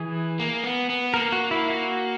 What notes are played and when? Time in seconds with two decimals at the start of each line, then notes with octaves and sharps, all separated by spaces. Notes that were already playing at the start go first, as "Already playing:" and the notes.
Already playing: E3 G#4
0.40 A#3
0.64 B3
0.89 B3
1.14 A#3 A#4
1.32 F#4
1.51 E4
1.70 F#4